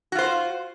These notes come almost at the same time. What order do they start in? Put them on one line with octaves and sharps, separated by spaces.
F#4 F4 C5